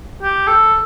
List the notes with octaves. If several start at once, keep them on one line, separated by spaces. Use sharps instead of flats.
G4
A4